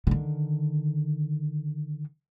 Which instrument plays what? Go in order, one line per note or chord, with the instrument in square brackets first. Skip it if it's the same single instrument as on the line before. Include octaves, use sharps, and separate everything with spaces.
[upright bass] D3 D#3